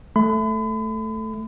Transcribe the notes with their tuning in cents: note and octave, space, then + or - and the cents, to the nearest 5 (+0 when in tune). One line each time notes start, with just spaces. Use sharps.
A3 +0 B5 +40